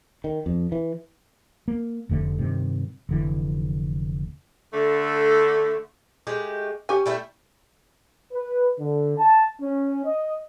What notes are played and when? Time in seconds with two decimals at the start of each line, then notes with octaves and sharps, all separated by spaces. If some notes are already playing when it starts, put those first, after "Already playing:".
0.24 D#3
0.46 F2
0.72 E3
1.68 A#3
2.09 F1 F2 D3 A3
2.38 G2 C3 D#3
3.09 F1 D3 E3
4.73 D3 A3
6.27 G#3 A3 G4
6.89 C#4 G4 G#5
7.06 G3 A3 E4
8.33 B4
8.79 D3
9.18 A5
9.61 C#4
10.05 D#5